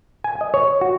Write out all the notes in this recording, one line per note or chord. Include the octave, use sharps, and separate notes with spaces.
G#5
D#5
C#5
F#4